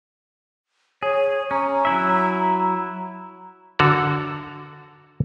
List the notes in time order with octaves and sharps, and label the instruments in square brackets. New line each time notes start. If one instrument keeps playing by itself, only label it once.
[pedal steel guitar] G#4 [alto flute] C#5
[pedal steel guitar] C#4 [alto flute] A#5
[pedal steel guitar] F#3 E4 E5
[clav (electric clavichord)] D3 F#4 A4 F#5 A#5